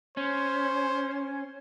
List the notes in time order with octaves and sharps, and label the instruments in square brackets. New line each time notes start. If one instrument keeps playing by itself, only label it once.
[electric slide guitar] C#4 [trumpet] C5